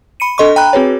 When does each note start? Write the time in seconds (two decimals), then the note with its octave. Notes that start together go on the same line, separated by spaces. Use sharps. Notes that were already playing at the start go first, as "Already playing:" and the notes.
0.20 B5 C#7 D#7
0.38 D4 A4 D#5 C6 C#6
0.56 G5 A#5 B5 F#6
0.73 C4 F#4 G#4 B4 C#5